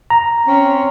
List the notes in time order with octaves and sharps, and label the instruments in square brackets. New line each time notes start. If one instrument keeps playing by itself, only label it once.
[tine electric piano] A#5
[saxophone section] C4 C#4